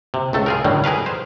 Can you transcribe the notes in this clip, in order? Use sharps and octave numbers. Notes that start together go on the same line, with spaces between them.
C3
C#2 A3 A4
F4 G#4 A#4
A2 D3 D#3 F#3 G3
G#4 A#4 B4 F5
C5